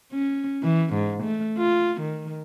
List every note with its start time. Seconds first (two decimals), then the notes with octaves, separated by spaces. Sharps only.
0.12 C#4
0.63 E3
0.94 G#2
1.24 A3
1.58 F4
2.01 D#3